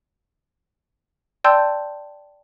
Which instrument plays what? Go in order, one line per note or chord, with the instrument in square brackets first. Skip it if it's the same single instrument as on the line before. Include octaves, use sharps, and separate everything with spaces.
[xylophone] D5 G5 A5 C6 E6 G6